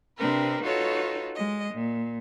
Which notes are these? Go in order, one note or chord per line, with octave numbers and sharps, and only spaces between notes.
C3 C4 D4 A#4 B4
D#4 F4 F#4 A4 B4 C#5
G#3 D#5
A#2